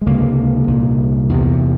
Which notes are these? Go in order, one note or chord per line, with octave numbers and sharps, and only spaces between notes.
G#3
C#2 C3 A#3
C2 A#2
E2 C3